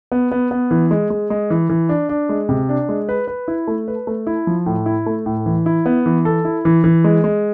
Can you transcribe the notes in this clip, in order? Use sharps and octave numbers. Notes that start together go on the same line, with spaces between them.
B3
B3
B3
E3
G#3
G#3
G#3
E3
E3
D4
D4
G#3
C3
D4
G#3
B4
B4
E4
A3
B4
A3
E4
F3
A2
E4
A3
A2
E3
E4
B3
E3
A4
E4
E3
E3
G#3
G#3